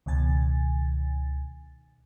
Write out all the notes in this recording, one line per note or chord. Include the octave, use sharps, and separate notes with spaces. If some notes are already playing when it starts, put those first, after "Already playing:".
C#2 B2 D#3 G#5 A6